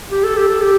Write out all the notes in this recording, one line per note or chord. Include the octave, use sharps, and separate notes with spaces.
G4
A4
G4
A4
G4